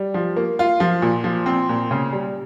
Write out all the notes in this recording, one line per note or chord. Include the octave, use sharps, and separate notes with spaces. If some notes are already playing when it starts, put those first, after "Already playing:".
Already playing: G3
F3
A#3
F4
F3
A#2
F3
C4
A#2
C#3
G3